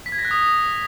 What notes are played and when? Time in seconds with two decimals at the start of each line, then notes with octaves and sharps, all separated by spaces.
0.06 B6
0.12 G#6
0.18 A#6
0.25 F#6
0.31 D#6